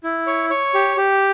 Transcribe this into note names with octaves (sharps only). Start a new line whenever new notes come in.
E4
C#5
C#5
G4
G4